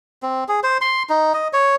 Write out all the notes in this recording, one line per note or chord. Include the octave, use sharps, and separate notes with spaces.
C4
G#4
C5
C6
D#4
D#5
C#5